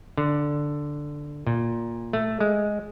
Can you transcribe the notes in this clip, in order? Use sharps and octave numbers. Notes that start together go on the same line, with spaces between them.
D3
A#2
A3
G#3